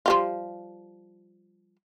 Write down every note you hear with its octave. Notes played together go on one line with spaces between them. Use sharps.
F3 G3 F4